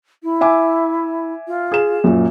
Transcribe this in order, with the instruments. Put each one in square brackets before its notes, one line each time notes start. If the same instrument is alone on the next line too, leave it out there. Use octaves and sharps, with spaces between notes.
[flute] E4
[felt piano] E5 G#5 D6
[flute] F4
[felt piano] G#4 E7
F#2 A#2